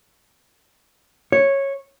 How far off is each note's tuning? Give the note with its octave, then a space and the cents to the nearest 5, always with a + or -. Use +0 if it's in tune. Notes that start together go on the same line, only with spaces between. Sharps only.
C#5 -10